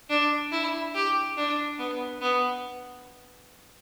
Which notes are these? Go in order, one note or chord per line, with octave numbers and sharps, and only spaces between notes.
D4
E4
G4
D4
B3
B3